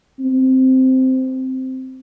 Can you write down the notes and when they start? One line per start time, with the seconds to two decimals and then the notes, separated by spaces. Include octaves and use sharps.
0.20 C4